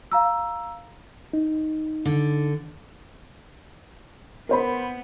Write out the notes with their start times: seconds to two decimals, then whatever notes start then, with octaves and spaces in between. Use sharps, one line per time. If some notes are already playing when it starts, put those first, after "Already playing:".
0.12 F5 A#5 E6
1.33 D#4
2.05 D3
4.49 B3 A#4 C5 B5